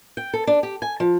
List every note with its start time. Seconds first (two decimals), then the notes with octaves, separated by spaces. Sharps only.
0.17 G5
0.33 A4
0.47 D4
0.63 G4
0.82 G#5
1.00 F3